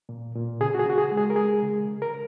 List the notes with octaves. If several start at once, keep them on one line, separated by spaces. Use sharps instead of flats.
A#2
A#2
C#3 G#4
F#4
G#4
C#3 F#4
G#4
G#3
G#4
A#4
G#3 G#4
C#3
C#3
A#4